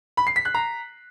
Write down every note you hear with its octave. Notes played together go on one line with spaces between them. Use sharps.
B5
C7
B6
F#6
A#5